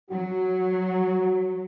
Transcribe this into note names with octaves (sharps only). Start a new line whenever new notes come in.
F#3 F#4